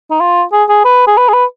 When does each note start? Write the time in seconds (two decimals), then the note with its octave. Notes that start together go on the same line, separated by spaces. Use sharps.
0.11 D#4
0.20 F4
0.52 G#4
0.69 G#4
0.85 B4
1.07 G#4
1.17 B4
1.28 G#4
1.33 B4